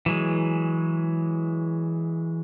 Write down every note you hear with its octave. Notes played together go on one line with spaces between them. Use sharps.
E3 F#3 G#3